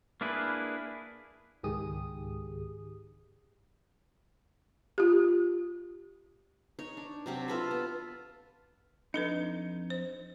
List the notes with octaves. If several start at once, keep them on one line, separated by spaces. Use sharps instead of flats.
A#3 D4 E4 G#4 B4
C#2 G#2 D#3 G4 G#4 D#6
F4 G4
D#4 C#5
D4
C3 F#3 C4
F4 A4 B4
B3
F2 D4 D#4 A4 B4
C5